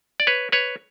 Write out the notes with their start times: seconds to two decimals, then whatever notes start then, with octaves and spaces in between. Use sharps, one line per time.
0.20 D5
0.27 B4 C#5
0.52 B4 C#5